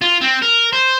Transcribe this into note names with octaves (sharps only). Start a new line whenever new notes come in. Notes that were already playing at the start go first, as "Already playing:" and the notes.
F4
C4
A#4
C5